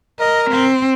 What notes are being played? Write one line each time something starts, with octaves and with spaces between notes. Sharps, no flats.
A#4 D#5
C4